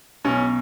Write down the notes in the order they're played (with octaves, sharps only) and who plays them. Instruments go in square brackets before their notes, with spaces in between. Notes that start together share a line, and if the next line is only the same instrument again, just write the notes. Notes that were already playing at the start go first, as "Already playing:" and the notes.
[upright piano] B1 B2 C#4